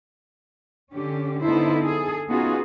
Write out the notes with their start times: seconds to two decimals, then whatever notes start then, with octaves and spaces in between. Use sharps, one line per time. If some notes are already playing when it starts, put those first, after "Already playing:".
0.94 D3 C#4 G4
1.42 D3 B3 D#4 E4 A4 C5
1.84 G#4 A4
2.28 B3 C#4 D#4 F4 F#4 G#4